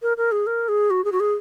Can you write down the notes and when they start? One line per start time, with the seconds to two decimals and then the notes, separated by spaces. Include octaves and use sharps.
0.02 A#4
0.17 A#4
0.32 G#4
0.47 A#4
0.69 G#4
0.90 F#4
1.05 G#4
1.12 F#4
1.20 G#4